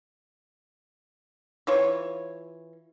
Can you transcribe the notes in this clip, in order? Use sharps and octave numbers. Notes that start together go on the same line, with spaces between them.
E3 F4 C#5